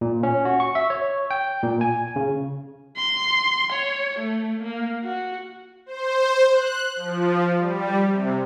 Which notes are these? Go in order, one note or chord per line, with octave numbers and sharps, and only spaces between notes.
A#2
C#4
F#4
C#6
E5
C#5
G5
A#2
G#5
C#3
C6
C#5
A3
A#3
F#4
C5
F#6
F3
G3
C3